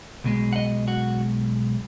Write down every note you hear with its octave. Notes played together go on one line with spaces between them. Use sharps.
B1 B2 G#3
F#5
D#5
F#4